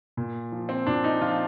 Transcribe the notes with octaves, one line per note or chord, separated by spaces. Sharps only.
A#2
F3
C4
A#2 D4
D#4
F3 F4